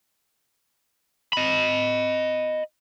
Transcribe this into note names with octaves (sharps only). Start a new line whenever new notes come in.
D#5 B5